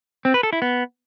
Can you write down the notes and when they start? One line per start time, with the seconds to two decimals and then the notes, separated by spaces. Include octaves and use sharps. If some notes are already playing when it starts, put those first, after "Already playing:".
0.25 C4
0.34 B4
0.43 A4
0.53 E4
0.62 B3